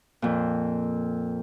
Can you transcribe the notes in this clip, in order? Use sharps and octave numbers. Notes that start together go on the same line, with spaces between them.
F2 A#2